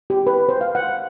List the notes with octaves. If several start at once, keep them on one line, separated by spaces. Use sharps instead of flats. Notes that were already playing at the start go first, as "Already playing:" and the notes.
G4
B4
C5
F5
F#5